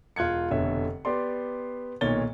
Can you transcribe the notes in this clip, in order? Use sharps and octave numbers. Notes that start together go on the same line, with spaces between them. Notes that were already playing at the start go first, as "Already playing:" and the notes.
E1 F4 F#6 G#6 C#7
F1 B2 D3 C#5 E5
B3 G4 D5 C6
B1 A#2 D#3 C#5 A6 G7